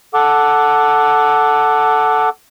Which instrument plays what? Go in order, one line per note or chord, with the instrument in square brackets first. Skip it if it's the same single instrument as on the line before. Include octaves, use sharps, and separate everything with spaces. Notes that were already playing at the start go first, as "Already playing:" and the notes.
[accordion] A4 F#5 D6